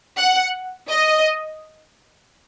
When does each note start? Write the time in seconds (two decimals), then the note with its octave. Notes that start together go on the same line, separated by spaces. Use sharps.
0.18 F#5
0.89 D#5